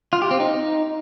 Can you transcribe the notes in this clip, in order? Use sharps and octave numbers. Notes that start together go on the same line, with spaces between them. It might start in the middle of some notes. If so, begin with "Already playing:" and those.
F4
G4
C4
D#4